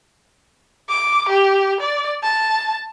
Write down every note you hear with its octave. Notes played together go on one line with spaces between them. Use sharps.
D6
G4
D5
A5